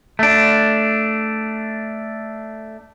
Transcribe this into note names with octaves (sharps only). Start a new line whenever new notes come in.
A3 D4